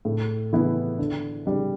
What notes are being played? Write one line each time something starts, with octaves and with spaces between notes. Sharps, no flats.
A2
E3 B3 E4
D3
G3 D4